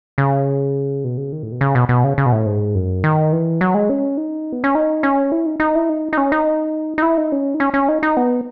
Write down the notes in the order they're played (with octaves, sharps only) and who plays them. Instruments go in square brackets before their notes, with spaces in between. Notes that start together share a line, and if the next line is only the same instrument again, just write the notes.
[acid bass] C#3
B2
C#3
D#3
A2
B2
C#3
B2
B2
C#3
C#3
B2
A2
G#2
F#2
D#3
E3
F#3
G#3
C#4
D#4
B3
C#4
D#4
C#4
E4
D#4
D#4
E4
D#4
D#4
C#4
D#4
D#4
E4
D#4
C#4
D#4
C#4
C#4
D#4
D#4
B3